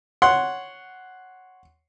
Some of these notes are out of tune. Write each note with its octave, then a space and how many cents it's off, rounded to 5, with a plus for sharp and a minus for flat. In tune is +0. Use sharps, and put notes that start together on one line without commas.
C#5 +0 F#5 +0 C6 +0